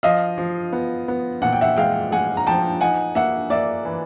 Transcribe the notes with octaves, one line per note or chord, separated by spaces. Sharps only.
F3 D#5 F5
F3
B3
B3
A#2 F#5
G5
E5 F#5
G#3 F5 G5
G#3 F#5 G#5
A#5
F3 G5 A5
D#4 F#5 G#5
A#3 E5 F#5
A#3 D5 E5
E3